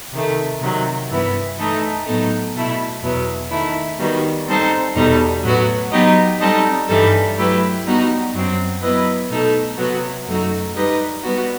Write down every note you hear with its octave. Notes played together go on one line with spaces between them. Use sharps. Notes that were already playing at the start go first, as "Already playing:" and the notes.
C3 D#3 A3
C3 D#3 F#3
G2 E3 B3 E4
E3 A3 D#4 A4 D#5
A2 F#3 B3 D#4 A4
B2 A3 E4
E2 B2 F#3 B3 E4
D#3 A3 E4
D#3 G3 B3 F#4
G3 C4 D#4 A4 C5
E2 B2 G3 D#4 A4
A2 F#3 B3 F#4
F#3 B3 D#4 G4 D#5
G3 C4 D#4 A4 D#5
G2 E3 G3 D#4 A4
F#3 A3 E4 G4 B4
G3 B3 D#4 F#4
F#2 F#3 C4
F#3 B3 E4 B4 D#5
B2 A3 D#4 A4
C3 F#3 B3 F#4
F#2 F#3 A3 D#4 F#4
G3 D#4 G4 B4 D#5
G3 B3 F#4